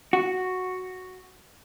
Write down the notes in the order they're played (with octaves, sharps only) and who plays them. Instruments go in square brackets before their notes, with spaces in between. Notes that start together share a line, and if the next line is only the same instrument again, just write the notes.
[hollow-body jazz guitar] F#4